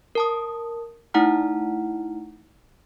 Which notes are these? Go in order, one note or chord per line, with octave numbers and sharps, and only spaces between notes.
A#4 A5 D#6
A3 D#4 E4 F#5 A#5 F6